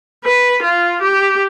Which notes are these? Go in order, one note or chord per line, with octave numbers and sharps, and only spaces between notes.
B4
F4
G4